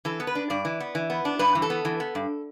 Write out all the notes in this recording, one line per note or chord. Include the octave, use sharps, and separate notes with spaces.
E3 A4
B3
B4
D4
G2 D5
E3
B3
E3
B3
D4
G2 B4
E3
A4
B3
E3
B3
G2